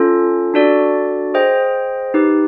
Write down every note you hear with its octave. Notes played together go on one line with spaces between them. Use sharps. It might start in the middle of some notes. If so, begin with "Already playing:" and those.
Already playing: C#4 F4 A4
D4 F#4 A4 D5
G#4 C5 D#5 G5
D#4 G4 B4